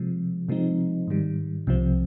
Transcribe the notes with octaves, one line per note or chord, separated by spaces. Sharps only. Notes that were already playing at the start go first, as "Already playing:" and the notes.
Already playing: C3 F3 G#3
C3 F3 G#3 C4 D#4
G#2 D#3 G3
C2 C3 F3 C4